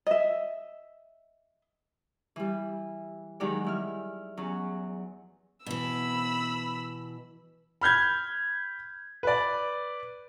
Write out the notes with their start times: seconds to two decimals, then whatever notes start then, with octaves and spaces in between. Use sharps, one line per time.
0.07 D#5 E5
2.36 E3 G3
3.40 D#3 F#3 G#3 D#4 G4 D5
3.65 G3 E4 F6
4.37 E2 F#3 C#4
5.66 B2 E3 B5 E6
7.81 B5 F6 G6 G#6
9.23 B4 D5